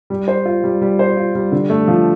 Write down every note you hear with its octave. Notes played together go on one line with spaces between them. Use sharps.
G3
C5
F4
G3
G3
C5
F4
G3
D3
A3
F3